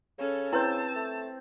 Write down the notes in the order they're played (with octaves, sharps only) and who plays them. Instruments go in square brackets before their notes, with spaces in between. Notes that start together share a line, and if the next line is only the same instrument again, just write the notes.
[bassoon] C#3 [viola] C#4 A4
[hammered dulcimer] C4 G5 [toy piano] E4 B4 C#5 [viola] A5
[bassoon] A3